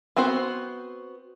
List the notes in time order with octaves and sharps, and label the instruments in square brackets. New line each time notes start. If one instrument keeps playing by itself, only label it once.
[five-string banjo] B3 C4 F#4 C5